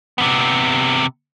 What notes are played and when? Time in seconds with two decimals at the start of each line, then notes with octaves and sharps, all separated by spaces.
0.18 C3 B3